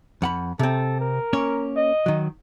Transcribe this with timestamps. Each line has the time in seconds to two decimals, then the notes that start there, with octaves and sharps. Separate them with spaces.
0.22 F2 F#5 B5
0.59 C3 C4 A4
1.01 A#4
1.33 A#3 C#4 C#5
1.77 D#5
2.06 D#3 F#3